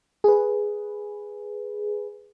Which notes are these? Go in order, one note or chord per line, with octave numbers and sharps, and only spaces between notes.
G#4 B4